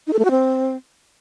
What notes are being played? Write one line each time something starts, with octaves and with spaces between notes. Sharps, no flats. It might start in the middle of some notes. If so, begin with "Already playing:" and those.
D#4
A4
A3
F#4
C4